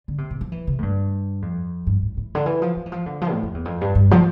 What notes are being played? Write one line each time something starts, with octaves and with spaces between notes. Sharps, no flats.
D3
C3
A#2
F3
E3
C3
A2
G2
F2
G2
A2
A2
D3
E3
F3
F3
E3
F3
D3
F3
A2
F2
E2
F2
G2
G2
F3